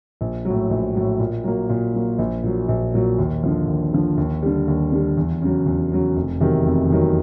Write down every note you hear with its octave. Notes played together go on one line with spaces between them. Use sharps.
A#1
F#3
A2
A#1
A2 F#3
A#2
F#3 A#3
A#2
F#3 A#3
A#1
A#2 F#3
A#1
A#2 F#3
D#2
D3 F3
D#2
D3 F3
D#2
D3 G3
D#2
D3 G3
E2
C#3 F#3
E2
C#3 F#3
F1
E2 C3 D#3 F#3
F1
E2 C3 D#3 F#3